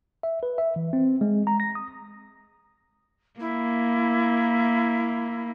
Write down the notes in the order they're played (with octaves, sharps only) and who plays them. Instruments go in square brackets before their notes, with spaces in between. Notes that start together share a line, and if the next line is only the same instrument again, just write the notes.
[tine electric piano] E5
B4
E5
E3
C4
G#3
A#5
A#6
D#6
[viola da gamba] A#3 [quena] E4